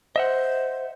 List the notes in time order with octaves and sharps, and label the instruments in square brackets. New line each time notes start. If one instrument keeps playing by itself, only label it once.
[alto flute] C5 [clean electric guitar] D#5 E5 F#5